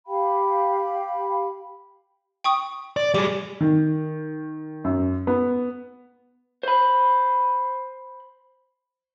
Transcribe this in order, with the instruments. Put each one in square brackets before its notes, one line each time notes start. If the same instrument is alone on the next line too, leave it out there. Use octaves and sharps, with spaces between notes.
[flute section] G4 F5 G5 B5
[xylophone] G5 C#6 D#6
[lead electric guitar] D5
[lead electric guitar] G3 G#4 [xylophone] D6
[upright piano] D#3
F#2
B3
[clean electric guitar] C5 B5